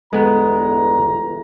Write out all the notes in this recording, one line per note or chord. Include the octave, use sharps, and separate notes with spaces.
G1 E2 G#3 B3 A4 A#5